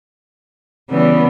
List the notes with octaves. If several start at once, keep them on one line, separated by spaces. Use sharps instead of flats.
C#3 E3 G3 B3